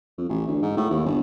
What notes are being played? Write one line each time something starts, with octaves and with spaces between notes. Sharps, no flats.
F2
A1
D2
G#2
A2
D#2
G1